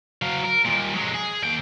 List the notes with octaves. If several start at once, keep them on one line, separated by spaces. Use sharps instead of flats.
F#3 F5
A#4
D#2 A#2
F#3 G#3
G#4
D#2 G5